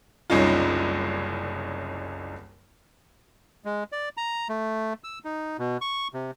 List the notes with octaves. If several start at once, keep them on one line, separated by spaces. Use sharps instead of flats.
F#1 C2 C#4 D#4 F4
G#3
D5
A#5
A3
E6
D#4
B2
C#6
C3